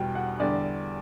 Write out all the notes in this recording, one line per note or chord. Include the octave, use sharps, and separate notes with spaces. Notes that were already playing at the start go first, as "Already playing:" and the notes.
Already playing: E2 B2 G3 G5
F#5
E2 D3 G3 D5